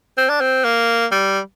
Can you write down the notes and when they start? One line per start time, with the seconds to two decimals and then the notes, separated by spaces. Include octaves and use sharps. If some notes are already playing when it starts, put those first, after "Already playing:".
0.17 C4
0.29 D4
0.41 C4
0.64 A#3
1.12 G3